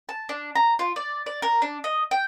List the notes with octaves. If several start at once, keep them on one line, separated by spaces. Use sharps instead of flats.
A5
D4
A#5
F4
D5
D5
A#4
D4
D#5
G5